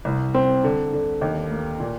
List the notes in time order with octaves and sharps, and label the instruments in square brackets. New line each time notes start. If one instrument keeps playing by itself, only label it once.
[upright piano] C2
C4
D3
D3
D#2
A#3
A#2